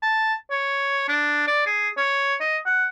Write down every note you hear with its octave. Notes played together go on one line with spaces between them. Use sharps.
A5
C#5
D4
D5
G#4
C#5
D#5
F#5